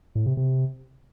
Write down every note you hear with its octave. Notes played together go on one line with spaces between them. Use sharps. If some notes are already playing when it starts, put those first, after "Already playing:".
A2
C3
C3